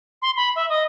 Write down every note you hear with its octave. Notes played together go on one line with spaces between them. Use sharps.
C6
B5
E5
D#5